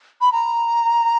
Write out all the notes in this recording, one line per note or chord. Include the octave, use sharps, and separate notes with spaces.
B5
A#5